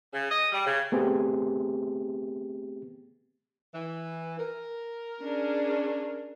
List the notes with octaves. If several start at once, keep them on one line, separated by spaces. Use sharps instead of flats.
C#3
D#5
G3
C#3
A3 B3 C4 G4 G#4
E3
A#4
C#4 D4 G#4